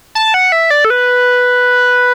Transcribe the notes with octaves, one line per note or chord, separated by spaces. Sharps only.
A5
F#5
E5
D5
A4
B4